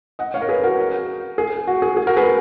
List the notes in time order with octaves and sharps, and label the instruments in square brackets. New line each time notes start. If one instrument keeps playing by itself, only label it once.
[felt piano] D#5 F#5
C#5 F5
A#4
G#4 B4
F#4 A#4
G#4
F#4
G#4
G#4
F#4 A#4
G#4 B4